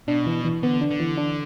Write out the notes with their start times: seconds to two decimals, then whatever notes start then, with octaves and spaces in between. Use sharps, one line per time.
0.08 B2 D4
0.27 E3
0.45 E3
0.63 D3 B3
0.81 D4
0.90 D3
1.00 E3
1.17 D4